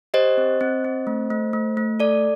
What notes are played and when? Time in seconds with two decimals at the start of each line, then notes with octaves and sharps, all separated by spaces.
0.14 G4 C5 D#5
0.38 C4
0.61 C4
0.84 C4
1.07 A3
1.30 A3
1.53 A3
1.77 A3
2.00 A4 D5